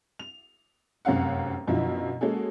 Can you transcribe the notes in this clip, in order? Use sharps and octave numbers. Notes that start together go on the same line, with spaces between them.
F7
F1 F#2 C4 C#4 F5 F#5
F#2 B2 D3 F3 E4 F4
G#3 A#3 C#4 F#4 G#4 A4